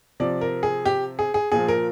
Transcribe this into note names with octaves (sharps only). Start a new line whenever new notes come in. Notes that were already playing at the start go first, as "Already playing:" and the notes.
C3 F3 D5
A#4
G#4
G4
G#4
G#4
A#2 F3 G#4
A#4